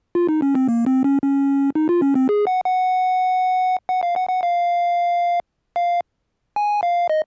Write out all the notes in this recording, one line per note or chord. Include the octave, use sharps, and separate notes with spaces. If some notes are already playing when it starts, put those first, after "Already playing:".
F4
D#4
C#4
C4
A#3
C4
C#4
C#4
D#4
F4
C#4
C4
G#4
F#5
F#5
F#5
F5
F#5
F#5
F5
F5
G#5
F5
D#5